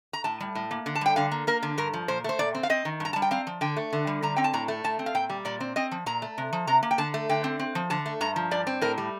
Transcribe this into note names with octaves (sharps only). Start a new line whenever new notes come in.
A#5
A2 A5
G3
A2
A#3
D3
A5
G3 G5
D3 F5
A#3
A#3 A#4
D3
G2 A#4
F3
A#2 C5
A3 C5
A#2 D5
C4
F5
C4 D#5
D#3
G2 A#5
G3 A5
G5
C4 F5
F3
D3 G5
A3
D3
G3
D3 A#5
C4 G5
A5
A2 A#5
A3
A2 A5
C4
F5
A#2 G5
G3
A#2 D5
C4
C4 D#5
F3
A#2 A#5
A3
C3
F3
C3 A#5
A#3
G5
D3 A5
A3
D3 G5
C4
C4
F3
D3 A5
A3
G2 A#5
F3
G2 D5
C4
A2 A#4
G3